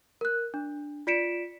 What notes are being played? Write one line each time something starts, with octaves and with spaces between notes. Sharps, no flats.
A#4 F#6
D4
F4 D5 B6 C#7 D7 E7